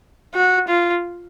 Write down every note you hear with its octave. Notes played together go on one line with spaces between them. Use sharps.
F#4
F4